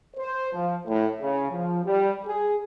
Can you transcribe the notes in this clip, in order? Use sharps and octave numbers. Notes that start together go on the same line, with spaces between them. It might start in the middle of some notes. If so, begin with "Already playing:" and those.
C5
F3
A2
C#3
F3
G3
G#4